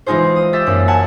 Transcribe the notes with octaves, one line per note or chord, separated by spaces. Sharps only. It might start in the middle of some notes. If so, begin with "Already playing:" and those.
E3 G#3 D#4 F4 G#4 C5
D#6
G4 E5 A6
F#2 A#3
F#5 G#5 A5